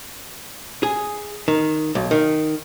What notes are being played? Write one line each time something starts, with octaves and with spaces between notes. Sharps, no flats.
G#4
D#3
B1
D#3